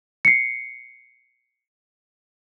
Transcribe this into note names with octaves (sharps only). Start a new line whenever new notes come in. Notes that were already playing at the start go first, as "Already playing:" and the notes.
C7 C#7